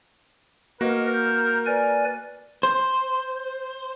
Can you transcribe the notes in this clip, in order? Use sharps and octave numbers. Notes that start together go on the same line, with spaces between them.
A#3 F#4 A#4 B4 D#5
G6
B4 D5 G#5
C5